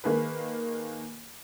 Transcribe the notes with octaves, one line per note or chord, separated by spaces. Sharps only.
D#3 A#3 G#4 B4